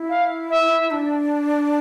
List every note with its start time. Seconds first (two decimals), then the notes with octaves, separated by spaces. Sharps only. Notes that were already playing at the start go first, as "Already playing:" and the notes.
Already playing: E4
0.09 F5
0.49 E5
0.91 D4